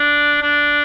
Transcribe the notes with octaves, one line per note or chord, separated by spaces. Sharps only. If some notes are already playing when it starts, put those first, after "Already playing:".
Already playing: D4
D4